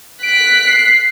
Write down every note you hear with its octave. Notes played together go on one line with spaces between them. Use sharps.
F#6 B6 D7
C7